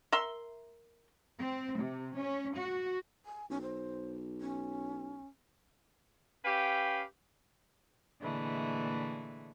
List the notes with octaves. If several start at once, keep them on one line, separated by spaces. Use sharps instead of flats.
A#4 E5 C6
C4
C3
C#4
F#4
G#5
B1 C#4
C5
C#4
C#4 G4 B4 F5 G5
A#2 D3 E3 G#3 A3